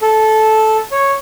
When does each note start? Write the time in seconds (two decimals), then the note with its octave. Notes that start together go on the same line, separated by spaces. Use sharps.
0.02 A4
0.91 C#5